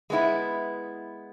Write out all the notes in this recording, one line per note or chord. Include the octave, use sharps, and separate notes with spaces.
G#3 B3 E4